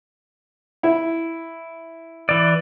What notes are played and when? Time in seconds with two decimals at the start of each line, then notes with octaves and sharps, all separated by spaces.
0.83 E4
2.29 E3 D5